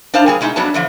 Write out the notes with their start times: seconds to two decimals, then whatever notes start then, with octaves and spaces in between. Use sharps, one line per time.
0.14 D4 D#4 C5 F5 A5
0.26 A#2 G3 G#4
0.41 B2 G#3 D#4 E4
0.56 F2 F#3 B3 D4 A5
0.74 D3 E3 F3